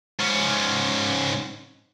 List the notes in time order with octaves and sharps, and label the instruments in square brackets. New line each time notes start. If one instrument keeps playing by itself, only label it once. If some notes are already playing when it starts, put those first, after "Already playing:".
[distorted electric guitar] G#2 C#4